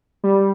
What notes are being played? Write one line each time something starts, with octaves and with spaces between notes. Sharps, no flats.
G3